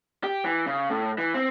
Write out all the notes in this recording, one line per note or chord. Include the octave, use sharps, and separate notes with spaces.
G4
E3
C#3
A2
E3
C4